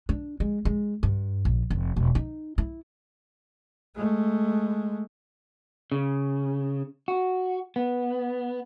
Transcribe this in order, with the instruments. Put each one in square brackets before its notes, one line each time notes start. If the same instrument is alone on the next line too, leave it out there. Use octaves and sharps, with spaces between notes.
[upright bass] D4
G#3
G#3
G2
A#1
F1
E1
D#4
E4
[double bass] G#3 A3
[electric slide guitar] C#3
F#4
B3